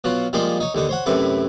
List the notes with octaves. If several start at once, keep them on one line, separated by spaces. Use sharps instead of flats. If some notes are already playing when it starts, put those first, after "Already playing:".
B2 F#3 F4 F#4
F3 G3 G#3 A#3 D#4 F4
D#4 C#5
D#2 D3 D#4
C5 C#5 F#5
F#2 A2 C3 E4 B4 C#6